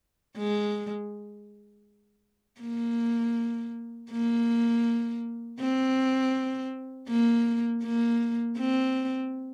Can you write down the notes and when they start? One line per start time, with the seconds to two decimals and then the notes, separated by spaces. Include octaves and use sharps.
0.37 G#3
2.61 A#3
4.11 A#3
5.60 C4
7.09 A#3
7.84 A#3
8.58 C4